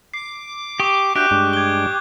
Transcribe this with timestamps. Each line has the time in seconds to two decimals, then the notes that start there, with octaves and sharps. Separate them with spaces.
0.14 D6 C7
0.80 G4 C#6 D#6
1.15 D4 F#4 G4 E5 D6 F#6 G6
1.31 G2 G#3 D4 F#6
1.53 G#6 G7